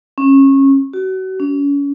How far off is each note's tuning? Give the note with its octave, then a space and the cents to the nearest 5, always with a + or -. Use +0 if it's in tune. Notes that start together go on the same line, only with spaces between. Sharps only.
C#4 -25
F#4 +35
C#4 +35